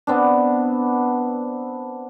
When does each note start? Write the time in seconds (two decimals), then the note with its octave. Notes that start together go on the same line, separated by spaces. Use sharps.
0.07 B3 C4 D4